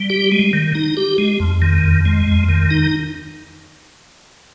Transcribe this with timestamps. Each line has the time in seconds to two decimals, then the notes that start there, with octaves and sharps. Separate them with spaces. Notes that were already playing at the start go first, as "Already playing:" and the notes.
Already playing: G3
0.10 G4
0.32 G#3
0.53 D#3
0.75 D#4
0.97 G4
1.18 G#3
1.40 F2
1.62 D#3
1.84 F2
2.05 G#3
2.27 F2
2.49 D#3
2.71 D#4